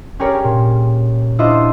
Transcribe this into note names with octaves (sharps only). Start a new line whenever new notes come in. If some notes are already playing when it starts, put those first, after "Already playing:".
C#4 G4 G#4 A#4 C#5 D5
A#2
D4 E4 F4 C5 D#5 E5